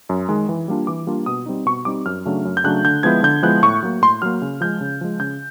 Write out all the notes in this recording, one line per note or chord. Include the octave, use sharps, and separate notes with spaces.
F#2
D#3 G#3
E3
G3 A#3 D4 F4
E3 D6
G3 A#3 D4 F4
B2 D#6
G3 C4 D#4
B2 C#6
G3 C4 D#4 D6
F#2 F6
C#3 F#3 A3 D4
F#2
G6
C#3 F#3 A3 D4 F#6
D3 G6
F3 G#3 B3 E4 G#6
D3 G6
F3 G#3 B3 E4 F#6
A2 C#6
F#3 A#3
A2 C6
F#3 A#3 F6
C#3
F3 G#3 G6
C#3
F3 G#3
C#3 G6